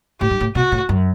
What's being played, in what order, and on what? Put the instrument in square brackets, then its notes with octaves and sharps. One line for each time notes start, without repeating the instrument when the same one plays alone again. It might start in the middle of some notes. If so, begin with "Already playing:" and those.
[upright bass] A2 [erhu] G4
[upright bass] G2
A2
[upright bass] B2 [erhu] F#4
[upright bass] A2
F#2